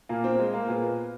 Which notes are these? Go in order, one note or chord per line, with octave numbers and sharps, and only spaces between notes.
A#2 A#3
C4
G#3
A#3
A#2 B3